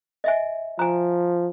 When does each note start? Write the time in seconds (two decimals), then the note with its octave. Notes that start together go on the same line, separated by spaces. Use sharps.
0.24 D#5 E5 G#5
0.79 F3 G#5 A#5